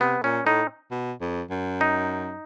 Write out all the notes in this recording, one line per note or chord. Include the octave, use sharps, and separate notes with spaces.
C3 B3
A#2 C#4
A2 D#4
B2
F2
F#2
D#4